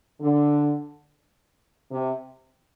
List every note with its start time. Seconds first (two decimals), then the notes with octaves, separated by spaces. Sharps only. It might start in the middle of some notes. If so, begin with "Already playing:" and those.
0.22 D3
1.91 C3